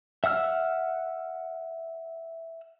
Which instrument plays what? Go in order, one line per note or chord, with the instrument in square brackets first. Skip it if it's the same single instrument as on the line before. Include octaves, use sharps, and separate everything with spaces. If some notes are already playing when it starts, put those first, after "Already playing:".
[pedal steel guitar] E5 F#5 E6 F6